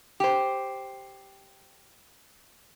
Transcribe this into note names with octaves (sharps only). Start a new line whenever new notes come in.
G4 C5